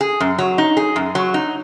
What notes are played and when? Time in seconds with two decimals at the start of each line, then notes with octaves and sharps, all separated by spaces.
0.01 G#4
0.20 F#2
0.38 F#3
0.58 D#4
0.77 G#4
0.96 F#2
1.15 F#3
1.34 D#4